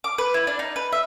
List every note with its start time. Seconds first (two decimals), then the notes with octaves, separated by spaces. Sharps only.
0.04 D6
0.18 B4
0.34 E4
0.47 D4
0.59 D#4
0.76 B4
0.93 E5